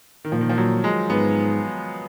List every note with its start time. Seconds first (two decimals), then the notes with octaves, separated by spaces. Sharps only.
0.25 D#3
0.32 A#2 F3
0.41 D#3
0.49 F3
0.58 F#3
0.84 G#3
1.09 G#2 B3